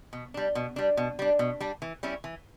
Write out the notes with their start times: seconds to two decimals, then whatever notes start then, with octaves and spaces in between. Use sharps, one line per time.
0.13 B2
0.34 G3 D4
0.55 B2
0.76 G3 D4
0.97 B2
1.19 G3 D4
1.39 B2
1.60 G3 D4
1.82 E3
2.03 G3 C#4 E4
2.24 E3